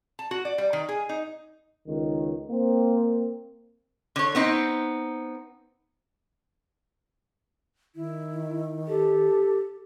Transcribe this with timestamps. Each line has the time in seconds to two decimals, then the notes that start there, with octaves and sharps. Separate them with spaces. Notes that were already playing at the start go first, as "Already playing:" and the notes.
0.19 A5
0.31 F#4
0.45 D5
0.58 G3
0.73 D#3
0.89 G#4
1.09 D#4
1.86 C#2 D#3
2.50 A#3 C4
4.16 D3 C#5
4.35 B3 C4 D#4
7.96 D#3 E4
8.88 G4 A4